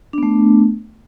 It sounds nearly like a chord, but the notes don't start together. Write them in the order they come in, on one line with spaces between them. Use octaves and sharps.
D4 B3 A3